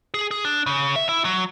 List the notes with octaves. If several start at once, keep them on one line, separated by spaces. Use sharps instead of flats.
G#4
G#4
D4
C#3
E5
E4
F#3